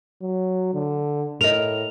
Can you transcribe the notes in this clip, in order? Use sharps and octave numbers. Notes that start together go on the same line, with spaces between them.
F#3
D3
A2 A#4 D#5 F7